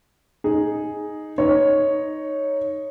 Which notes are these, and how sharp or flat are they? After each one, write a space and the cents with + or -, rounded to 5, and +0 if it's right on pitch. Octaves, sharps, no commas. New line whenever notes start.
D#4 +0 G#4 +0
D#4 +0 C#5 +0